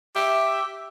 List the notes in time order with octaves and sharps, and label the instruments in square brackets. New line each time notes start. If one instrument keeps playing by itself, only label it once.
[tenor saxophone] G4 [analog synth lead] E5